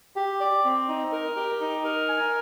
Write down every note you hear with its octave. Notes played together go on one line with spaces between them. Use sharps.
G4
D5
C4
D#4
A#4
G4
D#4
A#4
G#5